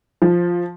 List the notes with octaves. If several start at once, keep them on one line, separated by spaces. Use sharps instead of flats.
F3